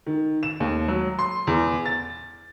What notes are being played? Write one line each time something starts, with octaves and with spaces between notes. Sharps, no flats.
D#3
E7
D#2
F#3
C6
E2
A6